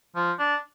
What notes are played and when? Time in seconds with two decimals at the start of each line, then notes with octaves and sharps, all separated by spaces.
0.15 F3
0.39 D4